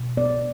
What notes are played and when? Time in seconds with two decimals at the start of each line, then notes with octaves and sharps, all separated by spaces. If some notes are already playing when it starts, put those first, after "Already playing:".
Already playing: B2
0.17 B3 D5